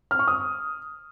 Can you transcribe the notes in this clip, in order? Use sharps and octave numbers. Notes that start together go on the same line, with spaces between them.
F6
C#6
D#6